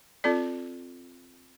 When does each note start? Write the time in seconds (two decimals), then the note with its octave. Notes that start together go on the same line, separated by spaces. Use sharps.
0.24 C4 F4 A4 D5